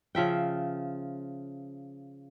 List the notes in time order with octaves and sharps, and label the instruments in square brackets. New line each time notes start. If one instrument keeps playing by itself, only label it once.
[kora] C#3 F3 E5 G5